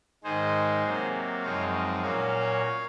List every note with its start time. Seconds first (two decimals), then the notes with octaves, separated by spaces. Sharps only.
0.24 G#2 D#3 G#3 D#4 G#4 C5
0.83 C3 F#3 A#3
1.43 F#2 F3 G#3 C4 D#4 C#5 F5
2.02 A#2 F#3 A#3 C#4 C#5 F5